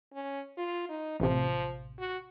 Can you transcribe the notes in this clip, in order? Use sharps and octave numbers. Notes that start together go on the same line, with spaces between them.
C#4
F4
D#4
A1 C3 F3
F#4